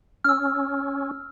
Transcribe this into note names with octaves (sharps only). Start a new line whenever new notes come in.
C#4 E6 F6